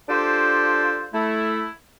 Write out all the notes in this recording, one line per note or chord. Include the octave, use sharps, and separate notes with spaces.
D4 F4 G4 A4 C5
A3 E4